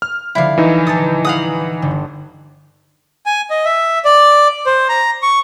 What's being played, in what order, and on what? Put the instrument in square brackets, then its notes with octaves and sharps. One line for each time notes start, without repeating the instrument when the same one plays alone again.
[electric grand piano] F6
[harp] D3 F3 G3 [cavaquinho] E4 F5
[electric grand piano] E3 D#4 [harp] G#5 F6
[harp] D#1 G6 A6 [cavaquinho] A5 D#6
[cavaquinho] F5 F#5 D#6
[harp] G1 D3
[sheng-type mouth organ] G#5
D#5
E5
D5
C5
A#5
C#6